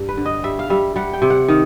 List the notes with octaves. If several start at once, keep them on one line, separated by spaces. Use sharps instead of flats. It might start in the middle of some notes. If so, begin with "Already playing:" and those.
Already playing: G2
B4
D3
D#5
G3 E5
F5
G3 E5
G3 F#5
G5
C3
F#5
D#3